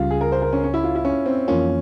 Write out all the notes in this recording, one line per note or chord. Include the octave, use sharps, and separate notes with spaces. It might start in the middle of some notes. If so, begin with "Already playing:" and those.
Already playing: C#2 C#3 G3 F4
G#4
A#4
C5
A#4
C#4
C#4
E4
F4
E4
C#4
C4
F2 E3 A#3 C#4 F4